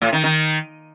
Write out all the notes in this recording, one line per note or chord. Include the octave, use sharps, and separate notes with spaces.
A2
D#3
D#3